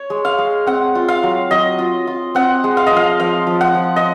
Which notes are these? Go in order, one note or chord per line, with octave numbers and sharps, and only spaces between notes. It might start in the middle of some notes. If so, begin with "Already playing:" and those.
Already playing: C#5
G#3
F5
G#3
C4 F#5
F4
F5
F#3
F#3 D#5
F4
F4
C4 F#5
G#3
F5
F3 D#5
F5
F3 F5
F3
F#5
F3
D#5